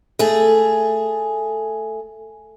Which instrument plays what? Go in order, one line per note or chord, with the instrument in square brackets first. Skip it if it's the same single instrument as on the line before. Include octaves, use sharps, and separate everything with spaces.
[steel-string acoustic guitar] A3 G#4